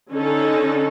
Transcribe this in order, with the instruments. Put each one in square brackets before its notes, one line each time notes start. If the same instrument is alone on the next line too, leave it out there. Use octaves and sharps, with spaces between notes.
[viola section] D3 C#4 D#4 A4